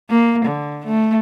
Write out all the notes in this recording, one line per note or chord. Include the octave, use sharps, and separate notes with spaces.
A#3
D3
A3